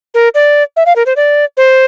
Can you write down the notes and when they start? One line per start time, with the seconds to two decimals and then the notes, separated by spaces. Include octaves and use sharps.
0.14 A#4
0.35 D5
0.76 E5
0.86 F5
0.96 A#4
1.06 C5
1.16 D5
1.57 C5